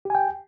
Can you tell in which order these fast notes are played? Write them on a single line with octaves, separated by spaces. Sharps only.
G4 G#5 G5